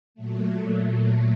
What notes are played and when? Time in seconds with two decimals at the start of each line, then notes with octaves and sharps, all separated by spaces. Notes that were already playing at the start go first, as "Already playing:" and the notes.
0.14 A#2 F#3 A3